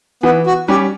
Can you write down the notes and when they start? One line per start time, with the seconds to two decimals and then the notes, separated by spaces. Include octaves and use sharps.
0.23 E3 B3
0.46 F#4
0.68 G3 C#4 G4